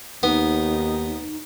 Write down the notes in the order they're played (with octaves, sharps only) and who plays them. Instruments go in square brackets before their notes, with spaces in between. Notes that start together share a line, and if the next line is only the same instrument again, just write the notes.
[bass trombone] D#2 [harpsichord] B3 [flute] D#4